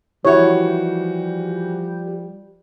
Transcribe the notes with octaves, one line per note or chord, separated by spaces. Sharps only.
E3 F3 G3 E4 F#4 G4 C#5